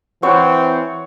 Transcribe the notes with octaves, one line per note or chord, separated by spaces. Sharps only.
E3 C4 C#5 F#5 B5 F#6